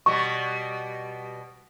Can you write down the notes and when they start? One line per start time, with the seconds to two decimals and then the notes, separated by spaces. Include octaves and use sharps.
0.06 B2 G3 C#6